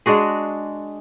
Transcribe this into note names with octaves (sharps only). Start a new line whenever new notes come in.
G#3 D4 F#4 G#4